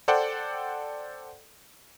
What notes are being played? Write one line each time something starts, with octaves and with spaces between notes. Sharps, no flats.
A4 C5 D5 F#5 G5